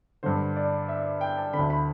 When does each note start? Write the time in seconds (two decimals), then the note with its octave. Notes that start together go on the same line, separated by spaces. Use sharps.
0.23 G2 D3 C5
0.56 D5
0.89 E5
1.21 G5
1.38 A5
1.53 D3 B5
1.59 D2
1.70 B5